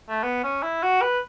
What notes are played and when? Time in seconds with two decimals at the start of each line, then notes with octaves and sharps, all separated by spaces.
0.09 A3
0.23 B3
0.44 C#4
0.63 E4
0.83 F#4
1.02 B4